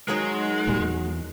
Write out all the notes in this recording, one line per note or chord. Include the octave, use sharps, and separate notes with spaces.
D#3 F#3 G#3 D#4
E1 A#2 G3
E2